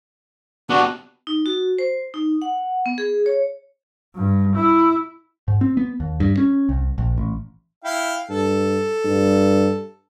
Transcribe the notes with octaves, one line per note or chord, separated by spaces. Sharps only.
B3 D4 F#4 G4
D#4
F#4
C5
D#4
F#5
B3
G#4
C#5
G2
E4
G#2
C4
B3
D#2
G2
C#4
C2
A#1
A1
E4 F5 G5
G2 A4
G2